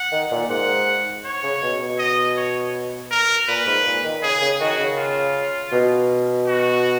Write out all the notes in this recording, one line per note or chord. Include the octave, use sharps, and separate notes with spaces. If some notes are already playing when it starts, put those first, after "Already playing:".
Already playing: F#5
D#3
A#2
G#2 F#5
C#5
C#3
B2
B2
D#5
C#5
A#4
A#2 B4
G#2
A#2
D#3
C#3 G#4
C#3
D#3 F#4
C#3
F4
B2
F#4